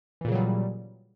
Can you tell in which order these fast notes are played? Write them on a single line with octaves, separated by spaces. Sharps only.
E3 A#2 C#3 F#3 G3